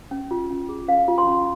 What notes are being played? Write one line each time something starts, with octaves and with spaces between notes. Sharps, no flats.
C#4
F4
C#4
G#4
C#4 F5
F4
C6
C#4